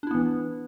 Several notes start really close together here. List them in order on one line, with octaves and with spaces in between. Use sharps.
D4 E4 B3 E3